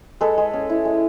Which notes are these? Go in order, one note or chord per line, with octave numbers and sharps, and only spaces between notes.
G#3 A4 B4
G#3
C#4
E4
G#3